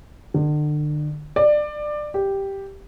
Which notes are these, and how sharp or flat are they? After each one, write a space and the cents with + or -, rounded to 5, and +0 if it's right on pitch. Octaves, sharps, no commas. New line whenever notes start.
D3 +35
D5 +20
G4 +0